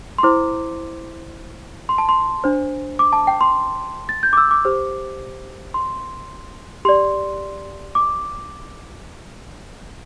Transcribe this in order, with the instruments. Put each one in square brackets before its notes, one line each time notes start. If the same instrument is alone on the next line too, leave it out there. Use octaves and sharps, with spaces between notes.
[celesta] C6
E4 C5 D6
C6
A5
C6
D4 C5
D6
A5
G5
C6
A6
G6
D6
E6
D6
G4 C5
C6
G4 D5 C6
D6